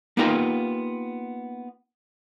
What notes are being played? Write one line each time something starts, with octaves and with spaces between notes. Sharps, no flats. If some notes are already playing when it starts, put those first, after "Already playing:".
A#3 B3 D#4 F4 G4 A#4